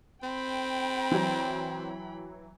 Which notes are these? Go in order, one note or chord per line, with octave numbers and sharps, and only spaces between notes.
C4 G5 B5
E3 F#3